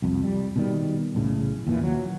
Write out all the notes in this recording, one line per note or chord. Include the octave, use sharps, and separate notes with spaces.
C2 F2
G3
B2 D#3 G3
B1 A2 C#3
D#2 A#2 E3
F#3